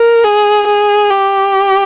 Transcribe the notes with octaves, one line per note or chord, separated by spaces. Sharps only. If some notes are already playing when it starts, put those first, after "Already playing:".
Already playing: A#4
G#4
G#4
G4